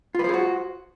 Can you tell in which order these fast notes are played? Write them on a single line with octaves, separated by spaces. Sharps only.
F4 B4 C5 G#4 F#4